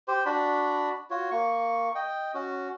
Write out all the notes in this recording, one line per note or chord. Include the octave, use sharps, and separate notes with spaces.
G4 C5
D4 F#4 D5 B5
F4 F#4 C#5
A#3 C#6
D#5 G5
C#4 F#4